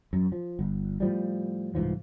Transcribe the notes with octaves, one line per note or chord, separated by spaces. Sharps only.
F#2
F3
G1
A2 F3 G3
C2 G#2 E3 F3